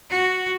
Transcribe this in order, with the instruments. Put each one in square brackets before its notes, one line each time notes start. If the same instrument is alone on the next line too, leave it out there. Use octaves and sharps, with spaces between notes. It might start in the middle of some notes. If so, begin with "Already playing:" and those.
[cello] F#4